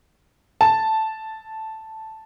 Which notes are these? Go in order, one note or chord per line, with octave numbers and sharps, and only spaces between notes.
A5